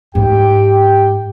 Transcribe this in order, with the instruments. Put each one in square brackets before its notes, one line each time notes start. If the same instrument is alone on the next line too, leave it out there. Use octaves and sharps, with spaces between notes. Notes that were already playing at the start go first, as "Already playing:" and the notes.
[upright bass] G#2 [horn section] G4 G5